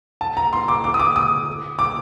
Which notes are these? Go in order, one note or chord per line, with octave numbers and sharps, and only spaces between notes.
A5
A#5
C6
D6
D6
D#6
D6
D#6
D6